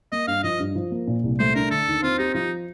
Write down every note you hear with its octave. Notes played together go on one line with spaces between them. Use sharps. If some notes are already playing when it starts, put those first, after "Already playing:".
A#3 D#5
G2 F5
F3 D#5
G2
F3
A#3
A#2
C2
A3 C5
D4 A#4
D3 A4
D#2
C4 F4
D#4 G4
F3 D#4